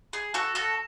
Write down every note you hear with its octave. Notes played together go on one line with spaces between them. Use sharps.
G#4
F#4 A4
F#4 A4